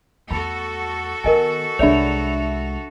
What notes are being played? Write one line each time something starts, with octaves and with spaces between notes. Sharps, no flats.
E2 A3 F#4 A4 B5
D#3 B3 A#4 D#5 G#5
C2 G#3 D4 C#5 D5 E5 F7